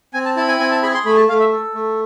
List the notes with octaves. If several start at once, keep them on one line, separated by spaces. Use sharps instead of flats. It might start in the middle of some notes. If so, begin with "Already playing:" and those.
C4 G#5
A5
E4 A5
G#5
C4 G#5
A5
G#4 B5
C6
A3 B5
A5
A3 F5
E5
A4
A3